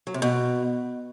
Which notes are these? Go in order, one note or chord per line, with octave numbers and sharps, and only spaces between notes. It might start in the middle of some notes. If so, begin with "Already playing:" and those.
F#3
C3
B2